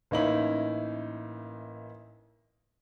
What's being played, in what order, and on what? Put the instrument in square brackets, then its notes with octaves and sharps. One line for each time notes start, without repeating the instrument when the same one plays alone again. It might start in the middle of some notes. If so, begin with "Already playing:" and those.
[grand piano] A1 A#3 C#4 D#4 E4 F#7